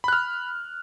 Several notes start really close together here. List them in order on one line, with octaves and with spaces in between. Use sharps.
B5 F#6 F6